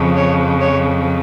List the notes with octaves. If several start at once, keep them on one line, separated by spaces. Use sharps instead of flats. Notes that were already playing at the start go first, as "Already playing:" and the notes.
Already playing: F2 C#3 F3
C#5
C#5